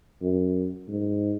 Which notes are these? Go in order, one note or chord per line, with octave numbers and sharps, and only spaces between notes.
F#2
G#2